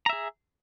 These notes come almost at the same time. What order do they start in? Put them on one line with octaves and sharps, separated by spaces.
A#5 E5 G#4